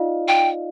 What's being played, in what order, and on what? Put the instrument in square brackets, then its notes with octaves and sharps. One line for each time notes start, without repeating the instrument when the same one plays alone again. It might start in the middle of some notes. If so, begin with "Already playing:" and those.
Already playing: [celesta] D#4 F4 D5 D#5 F5
[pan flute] G5